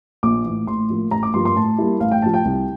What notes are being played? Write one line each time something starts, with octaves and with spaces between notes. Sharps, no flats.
A#1 D6
E3
A2
A1 C6
A2 F3 A#3
A1 A#5
D6
G2 F3 A#3 C6
C6
A2 A5
G3 A#3 E4
A1 F5
G5
A2 F3 A5
G5
C2